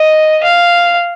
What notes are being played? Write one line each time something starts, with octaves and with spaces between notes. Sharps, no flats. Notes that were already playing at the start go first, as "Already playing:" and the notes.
Already playing: D#5
F5